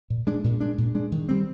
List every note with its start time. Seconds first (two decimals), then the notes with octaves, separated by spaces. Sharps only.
0.10 A#2
0.27 G#3 D4
0.44 A#2
0.60 G#3 D4
0.78 A#2
0.95 G#3 D4
1.12 D#3
1.29 G3 C4